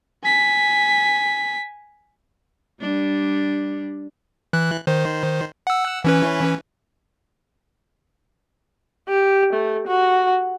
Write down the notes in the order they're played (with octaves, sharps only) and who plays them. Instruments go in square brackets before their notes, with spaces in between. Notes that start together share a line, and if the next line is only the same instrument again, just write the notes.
[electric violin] G#5 B6
[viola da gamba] G3 D4
[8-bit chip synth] E3 F#6
D#3 C5
F#5 E6
E3 C#4 B4
[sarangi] G4
A3
F#4